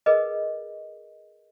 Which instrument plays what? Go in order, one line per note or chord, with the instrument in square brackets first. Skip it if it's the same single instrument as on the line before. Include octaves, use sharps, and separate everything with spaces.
[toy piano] G#4 A#4 B4 D#5